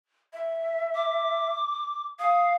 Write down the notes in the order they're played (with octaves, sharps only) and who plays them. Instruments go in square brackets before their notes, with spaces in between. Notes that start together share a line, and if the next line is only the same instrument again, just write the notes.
[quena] E5
[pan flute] D6
[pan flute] F5 [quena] D#6